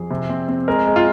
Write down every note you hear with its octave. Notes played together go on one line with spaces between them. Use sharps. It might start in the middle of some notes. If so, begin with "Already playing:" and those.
Already playing: F2 G#4
C3
C4
C4
G#3 A#4
G#3
F4